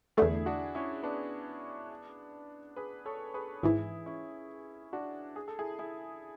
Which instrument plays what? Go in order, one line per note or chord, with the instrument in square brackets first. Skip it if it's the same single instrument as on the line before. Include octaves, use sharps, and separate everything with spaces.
[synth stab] E2 D3 A3 [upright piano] E4 G#4
[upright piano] D4 F#4
C#4 E4
B3 D4
G#4 B4
A4 C#5
G#4 B4
[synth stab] G#1 G#2 E3 [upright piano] E4 G#4
[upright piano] C#4 E4
D4 F#4
G#4
A4
E4 G#4
E4 G#4